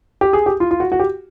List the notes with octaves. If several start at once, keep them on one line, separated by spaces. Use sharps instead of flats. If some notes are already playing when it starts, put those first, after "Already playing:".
G4
G#4
G4
F4
F4
F#4
F#4
G4